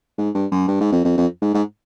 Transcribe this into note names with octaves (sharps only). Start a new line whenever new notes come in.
G#2
G2
F#2
G2
G#2
F2
F2
F2
G#2
G#2